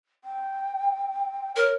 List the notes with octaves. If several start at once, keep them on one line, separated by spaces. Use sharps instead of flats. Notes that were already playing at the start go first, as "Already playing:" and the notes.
G5
A#4 C#5